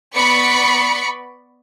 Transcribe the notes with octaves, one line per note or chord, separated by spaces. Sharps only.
B3 D5 B5 C#6 B6 C#7